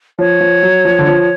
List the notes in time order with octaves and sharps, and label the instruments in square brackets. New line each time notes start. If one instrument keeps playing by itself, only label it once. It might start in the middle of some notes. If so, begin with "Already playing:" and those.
[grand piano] F3 [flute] C#5
[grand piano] F3
F#3
F3
D3
F3